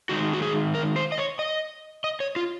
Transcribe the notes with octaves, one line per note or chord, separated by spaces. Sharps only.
D#3 G#3 D#4 F#4
F#4
G#4
A#4
C5
D#5
C#5
D#5
D#5
C#5
F4